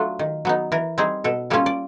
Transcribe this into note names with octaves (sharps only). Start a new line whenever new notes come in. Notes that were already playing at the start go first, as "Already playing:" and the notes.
Already playing: F#3 A3 D4 F4
D#3
F#3 B3 D#4
E3 A#4
G3 C4 D#4 G#4
B2 A4
G3 A#3 C#4 F4 A4
D5